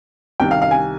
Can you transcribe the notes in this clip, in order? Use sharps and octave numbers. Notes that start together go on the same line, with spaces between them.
C2 C3 D#3 G5
F5
F5
G#5